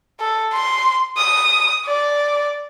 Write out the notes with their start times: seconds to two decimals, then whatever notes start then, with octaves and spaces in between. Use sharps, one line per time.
0.20 A4
0.53 C6
1.17 D#6
1.85 D5